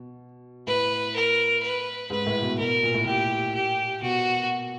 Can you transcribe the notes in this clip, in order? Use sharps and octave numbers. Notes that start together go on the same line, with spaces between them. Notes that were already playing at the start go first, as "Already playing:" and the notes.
Already playing: B2
A2 B4
A#4
B4
G#2 B4
A2
B2
B2 A#4
A#2
A2
A#2 G4
G4
B2 F#4